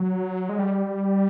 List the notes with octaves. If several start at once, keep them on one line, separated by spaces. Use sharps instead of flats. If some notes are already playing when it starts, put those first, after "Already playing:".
Already playing: F#3
G#3
G3